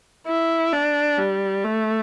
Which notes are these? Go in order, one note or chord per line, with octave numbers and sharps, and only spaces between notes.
E4
D4
G3
A3